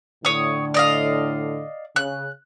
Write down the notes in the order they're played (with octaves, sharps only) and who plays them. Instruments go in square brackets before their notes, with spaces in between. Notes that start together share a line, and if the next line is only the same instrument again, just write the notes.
[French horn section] A2 D3 [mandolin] C#5 D#6
[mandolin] D5 D#5 F5
[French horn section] C#3 [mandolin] F#6